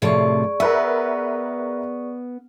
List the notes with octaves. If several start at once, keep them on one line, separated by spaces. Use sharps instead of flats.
A2 C3 F3 G#4 D5 C#6
B3 A#4 B4 E5